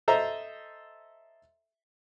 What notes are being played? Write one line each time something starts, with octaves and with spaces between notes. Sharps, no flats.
A4 C5 D#5 E5 A#5